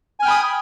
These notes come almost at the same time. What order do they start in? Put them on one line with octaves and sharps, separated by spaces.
G#5 F6 G5 B5 D#6